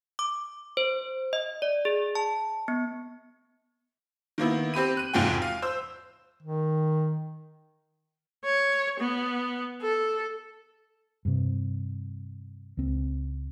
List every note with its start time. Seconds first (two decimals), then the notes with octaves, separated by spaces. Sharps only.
0.19 D6
0.77 C5
1.33 D#5
1.62 D5
1.85 G#4
2.15 A5
2.68 B3
4.38 D#3 A#3 B3 E4
4.74 C4 G4 B5 D#7
4.97 F#6 D#7
5.13 F1 E2 G#2 F4 F#4 G5
5.42 F5
5.62 C5 E6
6.43 D#3
8.45 C#5
9.00 B3
9.81 A4
11.25 G2 C3
12.77 C#2 C4